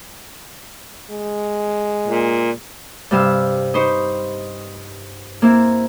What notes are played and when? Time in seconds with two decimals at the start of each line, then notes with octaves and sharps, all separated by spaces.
1.11 G#3
2.08 A#2
3.11 G2 C3 G3 F5 E6
3.74 D#4 B4 C5 C#6
5.42 A#3 C4 E4